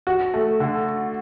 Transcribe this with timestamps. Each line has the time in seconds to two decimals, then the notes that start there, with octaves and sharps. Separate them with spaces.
0.07 F#4
0.34 A3
0.60 D3